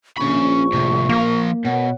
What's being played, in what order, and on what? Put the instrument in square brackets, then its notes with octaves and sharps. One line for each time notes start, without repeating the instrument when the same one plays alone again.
[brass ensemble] A#1 [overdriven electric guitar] C#4 B5 [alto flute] C#6
[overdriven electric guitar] A2 C3
[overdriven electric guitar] F3 A#4 [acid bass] A#3
[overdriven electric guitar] B2 [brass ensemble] A#4 C#5 F#5